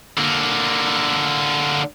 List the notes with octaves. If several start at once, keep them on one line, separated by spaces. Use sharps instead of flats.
D3 A#3